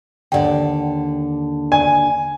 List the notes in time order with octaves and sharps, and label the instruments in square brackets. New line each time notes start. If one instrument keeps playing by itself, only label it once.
[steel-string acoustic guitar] D#2 D3 [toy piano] D5 F#5 G5
[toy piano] D5 [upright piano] G#5